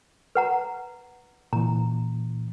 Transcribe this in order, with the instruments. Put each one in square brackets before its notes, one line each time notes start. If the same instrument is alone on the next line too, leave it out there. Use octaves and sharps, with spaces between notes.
[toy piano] B4 F#5 A#5
[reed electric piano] A#2 E3 [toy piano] A#5